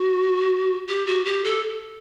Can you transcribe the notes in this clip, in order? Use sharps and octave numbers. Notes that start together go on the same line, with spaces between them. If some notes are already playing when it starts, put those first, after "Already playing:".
Already playing: F#4
G4
F#4
G4
A4